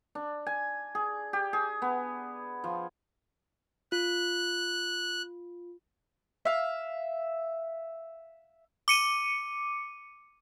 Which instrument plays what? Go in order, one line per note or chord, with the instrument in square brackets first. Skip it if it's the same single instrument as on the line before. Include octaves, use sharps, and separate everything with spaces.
[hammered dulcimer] D4
G#5
G#4
G4
G#4
B3
F3
[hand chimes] F4 [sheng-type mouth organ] F#6
[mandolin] E5 F5
[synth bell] D6 C#7 D#7